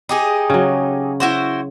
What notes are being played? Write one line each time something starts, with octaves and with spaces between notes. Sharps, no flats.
D#4 G4 G#4
C#3 F#3
E4 F#4 C5